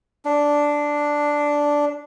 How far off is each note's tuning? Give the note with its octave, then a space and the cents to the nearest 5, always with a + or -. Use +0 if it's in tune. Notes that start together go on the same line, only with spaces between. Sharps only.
D4 -5